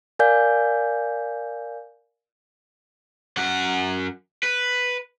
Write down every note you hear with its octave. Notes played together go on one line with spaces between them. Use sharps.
A#4 D5 F5 G#5 G6
F#2 F#5
B4